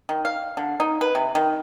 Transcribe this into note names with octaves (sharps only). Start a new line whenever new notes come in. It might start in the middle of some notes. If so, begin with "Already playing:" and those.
D#3
F5
D3
D#4
B4
C3
D#3